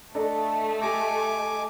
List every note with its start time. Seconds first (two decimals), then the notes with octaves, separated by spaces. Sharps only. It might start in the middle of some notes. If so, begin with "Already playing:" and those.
0.15 A3 D4 A4 D5 D#5
0.82 G4 G#5 D6 A#6